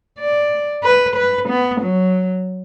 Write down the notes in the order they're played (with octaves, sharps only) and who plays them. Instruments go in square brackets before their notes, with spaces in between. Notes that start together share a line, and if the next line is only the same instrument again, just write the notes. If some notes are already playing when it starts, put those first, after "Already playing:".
[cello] D5
B4
B4
B3
F#3